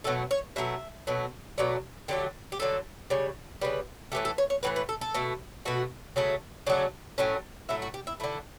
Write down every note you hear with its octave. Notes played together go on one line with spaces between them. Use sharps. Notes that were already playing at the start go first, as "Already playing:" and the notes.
B2 F#3 A3 A4
C#5
B2 F#3 A3 E5
B2 F#3 A3
B2 F#3 A3 D5
D3 F#3 A3 G4
G4
D3 F#3 A3 A4
C#3 G3 C#5
C#3 G3 B4
A2 E3 A3 G4
A4
C#5
C#5
A2 E3 A3 B4
B4
A4
A4
B2 A3
B2 A3 F#4
C#3 F#3 A3 E4
C#3 F#3 A3 D4
A2 F#3 A3 C#4
A2 F#3 A3 E4
F#4
G4
E4
D3 A3 E4